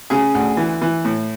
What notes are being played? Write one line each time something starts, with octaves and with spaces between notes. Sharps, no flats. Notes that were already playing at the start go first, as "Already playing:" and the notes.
C#3 G#4
D2
E3
E3
A2